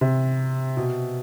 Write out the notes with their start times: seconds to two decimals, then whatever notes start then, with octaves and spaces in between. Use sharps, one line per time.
0.01 C3
0.77 B2